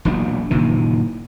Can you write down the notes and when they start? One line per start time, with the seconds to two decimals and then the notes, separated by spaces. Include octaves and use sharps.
0.05 E1 A#1 F#3 D4
0.50 F#1 A#2 D#3 E3